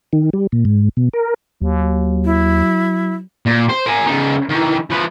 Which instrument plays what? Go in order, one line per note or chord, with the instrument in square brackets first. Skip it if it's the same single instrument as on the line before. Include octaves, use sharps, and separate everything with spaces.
[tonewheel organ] D#3
G3
A#2
G#2
B2
A#4
[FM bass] D#2 [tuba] F#3
[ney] E4
[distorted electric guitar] A#2
C5
A#4 G#5
C#3 D#4
D#3 E3
F3 B4